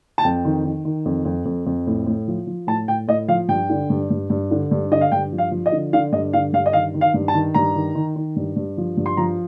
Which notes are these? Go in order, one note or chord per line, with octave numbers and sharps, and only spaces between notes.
A5
F2 G5
D#3
D#3
D#3
F2
F2
F2
F2
A2
A2
F3
F3
A2 A5
A2 G5
A2 D#5
F3 F5
G2 G5
D3
G2
G2
G2
D3
G2
D3 D#5
F5
G2 G5
F3
F5
F3
D#5
D3
D3 F5
G2 D#5
D3 F5
G2 F5
D#5
D#3 F5
D#3
F5
G2
A5
D#3
G2 A#5
D#3
D#3
D#3
G2
G2
F3
G2
C6
F3 A#5